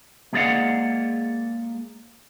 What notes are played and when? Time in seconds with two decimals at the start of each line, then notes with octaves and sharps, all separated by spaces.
0.33 G#3 A#3 G#4 D5 F5 F#5